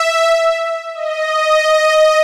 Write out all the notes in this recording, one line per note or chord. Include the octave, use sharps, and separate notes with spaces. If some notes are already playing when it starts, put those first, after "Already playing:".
Already playing: E5
D#5